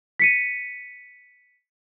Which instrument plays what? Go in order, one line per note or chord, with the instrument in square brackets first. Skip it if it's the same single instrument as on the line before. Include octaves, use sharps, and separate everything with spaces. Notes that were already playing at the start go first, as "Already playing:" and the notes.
[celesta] B6 C#7 D#7